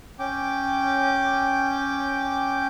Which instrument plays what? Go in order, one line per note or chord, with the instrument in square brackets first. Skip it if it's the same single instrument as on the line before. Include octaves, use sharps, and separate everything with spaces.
[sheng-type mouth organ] C#4 G5 D6